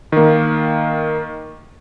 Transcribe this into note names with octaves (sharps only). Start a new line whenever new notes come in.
D#3 A#3